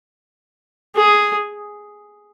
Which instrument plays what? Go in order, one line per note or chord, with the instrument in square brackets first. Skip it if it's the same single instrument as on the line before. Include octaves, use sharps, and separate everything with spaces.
[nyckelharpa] G#4